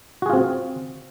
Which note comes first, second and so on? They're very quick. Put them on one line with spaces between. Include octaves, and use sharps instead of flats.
F#4 G#4 F4 C4